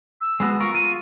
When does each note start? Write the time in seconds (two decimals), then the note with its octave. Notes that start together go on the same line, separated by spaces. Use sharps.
0.21 E6
0.40 G#3 B3 F#4
0.60 F4 A#4 C#6
0.74 F4 D#7